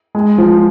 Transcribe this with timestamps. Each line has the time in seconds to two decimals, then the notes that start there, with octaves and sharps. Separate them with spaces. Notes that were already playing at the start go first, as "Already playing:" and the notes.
0.15 G#3
0.38 F3